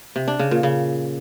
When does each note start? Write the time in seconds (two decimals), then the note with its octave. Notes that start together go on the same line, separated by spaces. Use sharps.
0.16 C3
0.28 D4
0.39 C#3
0.51 A#2
0.63 C#3